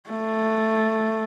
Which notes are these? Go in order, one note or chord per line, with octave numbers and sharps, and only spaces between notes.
A3